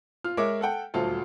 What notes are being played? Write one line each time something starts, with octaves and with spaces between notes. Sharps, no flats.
F4 F6
G#3 A#4 C#5 E5 D6
A4 F#5 G5
D#1 D2 F#3 F4 A4